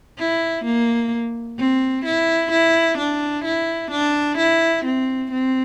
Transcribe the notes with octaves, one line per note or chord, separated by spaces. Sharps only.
E4
A#3
C4
E4
E4
D4
E4
D4
E4
C4
C4